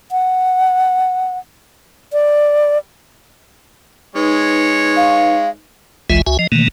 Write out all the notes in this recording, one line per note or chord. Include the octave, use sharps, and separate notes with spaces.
F#5
D5
G#3 D#4 B4 C#5
F5
G#1 C#2 E3 G#3 F4 E5
C#2 F#4 E5 G#5
F3 D#5
B2 D#3 E3 A3 A#3